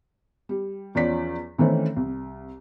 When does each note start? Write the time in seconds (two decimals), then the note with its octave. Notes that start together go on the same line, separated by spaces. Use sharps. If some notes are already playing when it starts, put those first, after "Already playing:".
0.49 G3
0.95 E2 F3 C#4 D5 B6
1.58 D#3 E3 A3 C4 C#4
1.96 C2